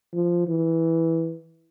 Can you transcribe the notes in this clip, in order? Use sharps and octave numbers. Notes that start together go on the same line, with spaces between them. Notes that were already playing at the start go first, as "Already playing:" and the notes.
F3
E3